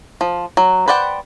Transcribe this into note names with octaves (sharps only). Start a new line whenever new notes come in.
F3
F#3
B4 C5 D5 F#5 G5